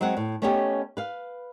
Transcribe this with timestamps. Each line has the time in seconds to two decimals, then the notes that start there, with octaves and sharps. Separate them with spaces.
0.01 F#3 G#3 C4 F#5
0.17 A2
0.42 A3 B3 C#4 D#4 G4 C#5
0.97 B4 F5